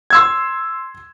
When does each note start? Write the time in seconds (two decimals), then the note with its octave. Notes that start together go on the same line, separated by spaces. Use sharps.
0.10 C6 E6 G#6